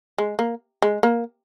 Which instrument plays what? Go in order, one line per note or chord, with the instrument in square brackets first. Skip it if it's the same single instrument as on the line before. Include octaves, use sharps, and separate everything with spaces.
[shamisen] G#3
A#3
G#3
A#3